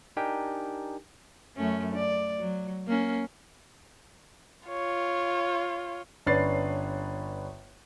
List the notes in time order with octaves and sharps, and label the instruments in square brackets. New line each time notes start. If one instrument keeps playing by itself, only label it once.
[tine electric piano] D4 D#4 G4 A#4 G5 G#5
[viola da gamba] F#2 A3 C#4
D5
F#3
A#3 C#4
[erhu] F4 [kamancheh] C#5
[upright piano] G1 C#4 D4 B4 A6 C7